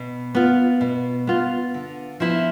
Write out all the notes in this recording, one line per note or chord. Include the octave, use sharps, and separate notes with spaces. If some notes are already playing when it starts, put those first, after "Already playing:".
Already playing: B2
B3 F4
B2
B3 F4
D3
F3 B3 E4